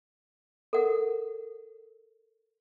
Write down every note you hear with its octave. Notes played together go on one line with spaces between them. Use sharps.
A4 A#4 F#5